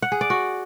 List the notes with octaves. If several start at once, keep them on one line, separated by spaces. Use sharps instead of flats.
F#5
G#4
D5
F#4